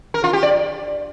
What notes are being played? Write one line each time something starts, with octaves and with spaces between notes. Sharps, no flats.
A#4
F4
G4
D5